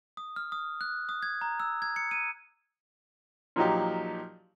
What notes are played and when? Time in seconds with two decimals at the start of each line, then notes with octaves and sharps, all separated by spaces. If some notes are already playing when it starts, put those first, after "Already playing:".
0.17 D#6
0.36 F6
0.52 D#6
0.81 F#6
1.09 D#6
1.22 G#6
1.41 A#5
1.60 E6
1.82 G#6
1.96 C#7
2.11 D#7
3.56 A#2 F3 F#3 D#4 G4